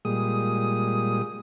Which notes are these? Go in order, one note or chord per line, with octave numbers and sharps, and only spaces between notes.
A#2 G3 G#3 D#6